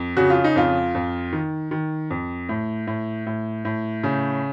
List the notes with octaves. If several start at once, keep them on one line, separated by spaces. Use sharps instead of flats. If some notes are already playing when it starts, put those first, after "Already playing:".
Already playing: F2
C#3 F#4
F4
D#4
F2 F4
F2
D#3
D#3
F2
A2
A2
A2
A2
C#3